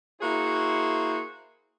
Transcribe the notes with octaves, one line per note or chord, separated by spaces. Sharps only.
A#3 E4 F#4 G#4 C5